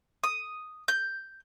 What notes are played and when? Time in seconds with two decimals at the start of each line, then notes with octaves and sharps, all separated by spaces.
0.24 D#6
0.88 G6